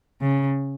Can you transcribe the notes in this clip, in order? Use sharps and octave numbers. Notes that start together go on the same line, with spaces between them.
C#3